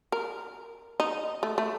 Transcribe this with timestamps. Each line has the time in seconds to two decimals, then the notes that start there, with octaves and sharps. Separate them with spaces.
0.12 A#4
1.00 D#4
1.43 A3
1.58 A3